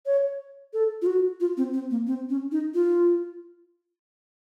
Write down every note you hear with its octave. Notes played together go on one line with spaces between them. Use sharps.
C#5
A4
F4
F#4
F4
C4
C4
A#3
C4
C#4
D#4
F4